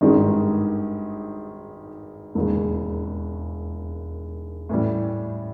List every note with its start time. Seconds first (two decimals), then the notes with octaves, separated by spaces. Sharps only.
0.01 G#1 G2 D#3 G#3
2.35 E1 D#2 C#3
4.69 A2 E3 G3